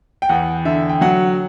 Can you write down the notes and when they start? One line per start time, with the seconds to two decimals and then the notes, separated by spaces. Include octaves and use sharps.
0.22 G5
0.29 E2 F#5
0.65 D3 E5
0.89 G5
1.01 F#3 F#5